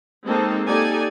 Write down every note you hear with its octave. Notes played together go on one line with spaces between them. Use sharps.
G#3 A#3 C4 D#4 A4
A#3 D#4 G4 A4 D5 G#5